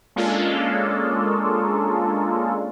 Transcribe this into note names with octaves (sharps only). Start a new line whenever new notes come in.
G#3 A#3 C#4 D4 F4 A4